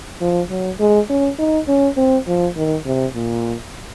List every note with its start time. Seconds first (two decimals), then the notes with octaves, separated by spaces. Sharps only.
0.21 F3
0.50 F#3
0.80 G#3
1.10 C#4
1.39 D#4
1.68 C#4
1.97 C4
2.27 F3
2.56 D#3
2.85 C3
3.15 A#2